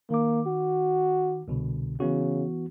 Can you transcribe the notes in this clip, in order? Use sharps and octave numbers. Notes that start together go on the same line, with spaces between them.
D#3 A#3 D6
F#4
C2 B2 D3
C#3 E3 B3 F#4